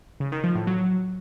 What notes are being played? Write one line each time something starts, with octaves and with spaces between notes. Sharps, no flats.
C#3
D#3
F3
A2
F#3